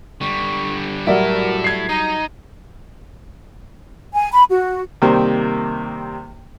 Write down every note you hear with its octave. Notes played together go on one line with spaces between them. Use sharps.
D3 G3 C#6
F#3 G3 E4 F#4 A4 A#4 D5 E5
G#6 C7
D#4 D#5 A#5
G#5
B5
F#4
C3 D#3 G3 A#3 C5